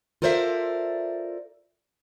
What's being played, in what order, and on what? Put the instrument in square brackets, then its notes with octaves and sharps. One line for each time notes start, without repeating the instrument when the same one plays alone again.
[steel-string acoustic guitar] F4 A4 A#4 C5 D5 E5